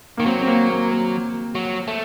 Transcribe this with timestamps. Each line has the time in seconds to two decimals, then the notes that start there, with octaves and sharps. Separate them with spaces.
0.17 D#3 A#3
0.26 F#3 C4
0.42 C4
0.47 A#3
0.70 A#3
0.91 A#3
1.55 F#3
1.88 A3